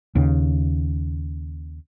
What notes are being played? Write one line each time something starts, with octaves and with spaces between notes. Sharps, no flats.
D#2 C#3